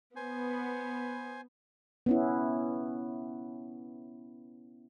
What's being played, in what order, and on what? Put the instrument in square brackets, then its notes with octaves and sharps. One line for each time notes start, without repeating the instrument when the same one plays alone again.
[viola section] B3 [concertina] C5 G#5
[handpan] B3 C#4 E4